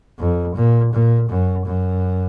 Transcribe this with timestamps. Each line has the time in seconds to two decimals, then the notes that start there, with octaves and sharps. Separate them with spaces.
0.19 F2
0.55 A#2
0.93 A#2
1.29 F#2
1.66 F#2